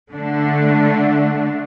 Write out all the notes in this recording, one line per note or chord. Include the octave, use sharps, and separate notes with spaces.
D3 A3 D4